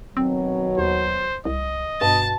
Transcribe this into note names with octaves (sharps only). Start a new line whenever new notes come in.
B2 D#3 F#3 C4
D#2 C5
C2 D#5
G2 B2 A5